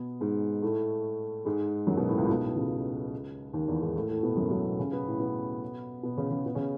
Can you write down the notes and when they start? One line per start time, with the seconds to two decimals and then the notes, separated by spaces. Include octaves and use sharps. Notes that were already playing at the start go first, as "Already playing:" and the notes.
Already playing: B2 B3
0.20 G#2 G#3
0.62 A2 A3
1.45 G#2 G#3
1.87 F#2 F#3
1.97 B2 B3
2.08 A2 A3
2.18 C#2 C#3
2.29 B1 B2
2.43 A2
2.56 C#2 C#3
3.53 D#2 D#3
3.68 E2 E3
3.81 G#2 G#3
3.95 A2 A3
4.09 A2 A3
4.23 B2 B3
4.37 F#2 F#3
4.50 F#2 F#3
4.65 B2 B3
4.79 C#3 C#4
4.92 B2 B3
5.06 A2 A3
5.20 B2 B3
6.03 B2 B3
6.18 C#3 C#4
6.31 C#3 C#4
6.46 B2 B3
6.55 C#3 C#4